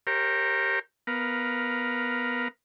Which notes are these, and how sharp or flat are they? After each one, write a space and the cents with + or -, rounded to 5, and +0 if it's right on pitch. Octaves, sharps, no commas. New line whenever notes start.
G4 +0 A#4 -5 C#5 -45
B3 +0 A#4 +10 F5 +0